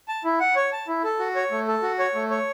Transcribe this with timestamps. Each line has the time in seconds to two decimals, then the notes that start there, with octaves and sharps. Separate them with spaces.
0.08 A5
0.24 E4
0.40 F#5
0.56 C#5
0.72 A5
0.88 E4
1.04 A4
1.19 F#4
1.35 C#5
1.51 A3
1.68 A4
1.83 F#4
1.99 C#5
2.15 A3
2.30 C#5